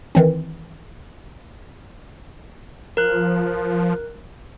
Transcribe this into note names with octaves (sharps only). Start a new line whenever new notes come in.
D#3 E3 C4
F3 A#4 F#6